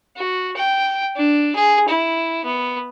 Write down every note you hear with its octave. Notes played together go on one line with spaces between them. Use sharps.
F#4
G5
D4
G#4
E4
B3